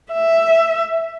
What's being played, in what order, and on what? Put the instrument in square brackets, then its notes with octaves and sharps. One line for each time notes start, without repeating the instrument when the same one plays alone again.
[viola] E5